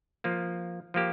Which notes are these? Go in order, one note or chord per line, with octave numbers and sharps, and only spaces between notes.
F3 A#3 F4
F3 A#3 G4